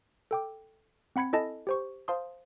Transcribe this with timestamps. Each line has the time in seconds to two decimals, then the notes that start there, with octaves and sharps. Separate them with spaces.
0.31 A4 G5 D6
1.16 C4 F#5 B5 G#6 C#7
1.33 E4 A4 D#5 G#5 A5 A#6
1.67 G4 C5 C#6
2.08 C5 F5 A5 C6 D#6